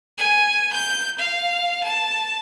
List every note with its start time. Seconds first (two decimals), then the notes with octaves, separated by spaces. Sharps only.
0.18 G#5
0.73 G6
1.19 F5
1.84 A5